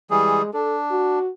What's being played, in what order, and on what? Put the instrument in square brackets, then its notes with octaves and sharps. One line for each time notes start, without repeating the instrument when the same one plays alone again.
[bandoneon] E3 G3 G#4 [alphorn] G#3
[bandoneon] D4 [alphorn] A4
[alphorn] F#4